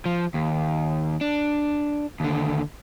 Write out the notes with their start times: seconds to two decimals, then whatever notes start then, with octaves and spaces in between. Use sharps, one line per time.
0.06 F3
0.34 D#2
1.21 D4
2.20 D#2 D3